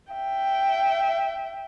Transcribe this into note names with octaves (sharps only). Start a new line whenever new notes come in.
E5 G5